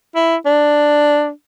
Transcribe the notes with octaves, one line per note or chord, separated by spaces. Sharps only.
E4
D4